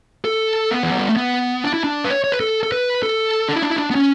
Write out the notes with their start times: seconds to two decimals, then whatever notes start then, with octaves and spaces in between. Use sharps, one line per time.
0.25 A4
0.71 B3
0.83 E3
0.92 F#3
0.99 G3
1.09 A3
1.16 B3
1.64 D4
1.74 E4
1.84 D4
2.04 B4
2.10 C#5
2.24 C#5
2.32 B4
2.40 A4
2.63 A4
2.72 B4
3.03 A4
3.48 D4
3.55 E4
3.63 D4
3.70 E4
3.76 D4
3.90 B3
3.95 C#4